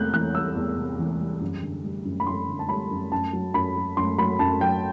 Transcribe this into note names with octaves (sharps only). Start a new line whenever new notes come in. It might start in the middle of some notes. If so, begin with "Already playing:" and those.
Already playing: E2 C3 F#6 G6
E3 F#6
G3 E6
E2
C3
E3
G3
F#2
D3
G3
F#2
B5
F#2 C6
D3
A5
G3 B5
F#2
F#2 A5
F#3
F#2 B5
F#3
F#2 C6
F#3 B5
F#2 A5
F#3 G5